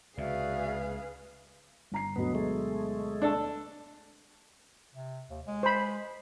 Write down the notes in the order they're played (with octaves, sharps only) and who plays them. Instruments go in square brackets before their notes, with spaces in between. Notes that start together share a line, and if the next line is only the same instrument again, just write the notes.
[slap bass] C#2 C3 [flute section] F#4 D5 E5 [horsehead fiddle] G#4 B4 [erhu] F5
[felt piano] G1 A#5 C7
[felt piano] D2 B2 F#3 [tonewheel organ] B3
[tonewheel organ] G#3 A3
[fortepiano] D4 A4
[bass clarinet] C3
D#2
G#3
[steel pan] C5 B5